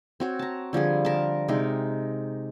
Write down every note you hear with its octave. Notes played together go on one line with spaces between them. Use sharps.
C4 F#4 C#5
A5 A#5
D3 F3 G3 G#4
A#4 A5
C3 G#3 D#4 A#4